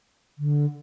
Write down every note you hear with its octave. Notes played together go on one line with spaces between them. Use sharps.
D3